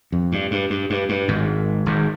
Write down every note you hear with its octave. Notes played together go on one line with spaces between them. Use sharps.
F2
G2
G2
G2
G2
G2
G#1 G#2
G#1 G#2